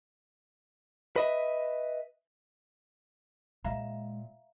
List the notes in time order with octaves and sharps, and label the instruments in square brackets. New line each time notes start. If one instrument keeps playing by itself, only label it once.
[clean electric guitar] B4 D#5 E5
[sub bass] A#2 [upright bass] G#3 [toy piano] E5 F5 A#5